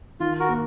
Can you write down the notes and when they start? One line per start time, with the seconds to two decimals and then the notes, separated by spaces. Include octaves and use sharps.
0.20 D#3 F4
0.40 F#4 A#4
0.49 A#3